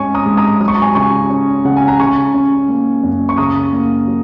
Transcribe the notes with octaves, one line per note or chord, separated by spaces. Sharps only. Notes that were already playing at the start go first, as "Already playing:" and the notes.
Already playing: G#2 G#3 C#4 G#5 C#6
A#5 D#6
G#2
A#5 D#6
F#3 D#6
C#6
A#5
G#5 C#6
C#3 G#5 C#6
C#4
C#3 F#5
G#5
A#5
C#3 G#5 C#6
C#4
A#3
F#2
C#6
C#3 A#5 D#6
A#3
F#3